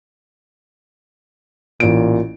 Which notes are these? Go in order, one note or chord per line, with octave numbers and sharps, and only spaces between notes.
A1 A#2 D7